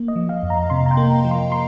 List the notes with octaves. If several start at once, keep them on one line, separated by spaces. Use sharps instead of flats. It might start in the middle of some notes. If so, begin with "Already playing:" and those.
Already playing: A#3
D#5
F3
F5
F2
A#5
C3 C6
A#5
G5
A#3
F3
C6
C6